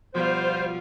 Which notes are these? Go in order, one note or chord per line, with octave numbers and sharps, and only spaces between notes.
B2 F3 G3 F4 C5